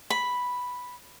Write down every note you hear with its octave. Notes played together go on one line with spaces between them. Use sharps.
B5